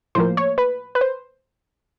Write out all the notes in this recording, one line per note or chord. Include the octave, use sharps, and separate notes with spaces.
A2 F3 A#3 C5
C#5
B4
B4
C5